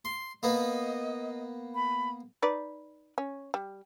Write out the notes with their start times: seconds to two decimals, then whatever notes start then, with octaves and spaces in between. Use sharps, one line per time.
0.05 C6
0.43 A#3 B3 D#5
1.74 B5
2.42 D#4 B4 D5
3.18 C#4
3.54 G3